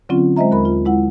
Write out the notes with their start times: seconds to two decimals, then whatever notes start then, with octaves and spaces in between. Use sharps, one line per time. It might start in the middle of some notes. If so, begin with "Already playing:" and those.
0.09 D3 F#3 C4 C#4 F4
0.36 G#3 C5 D#5 E5 A#5
0.52 D#2 A#4 B5
0.65 F4
0.85 G#3 E4 F#5